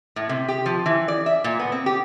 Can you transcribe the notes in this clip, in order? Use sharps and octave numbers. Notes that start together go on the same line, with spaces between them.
A2
C3
G4
F3
E3
D5
E5
A#2
B3
C4
G4